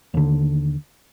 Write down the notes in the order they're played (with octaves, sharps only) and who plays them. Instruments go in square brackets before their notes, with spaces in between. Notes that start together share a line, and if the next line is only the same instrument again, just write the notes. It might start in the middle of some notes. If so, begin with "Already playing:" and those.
[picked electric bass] D#2 D3